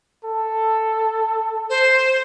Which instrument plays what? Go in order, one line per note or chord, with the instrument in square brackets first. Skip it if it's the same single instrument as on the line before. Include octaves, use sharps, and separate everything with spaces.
[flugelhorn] A4
[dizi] C5